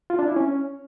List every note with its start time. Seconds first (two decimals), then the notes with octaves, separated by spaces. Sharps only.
0.10 F4
0.19 D4
0.28 E4
0.36 C#4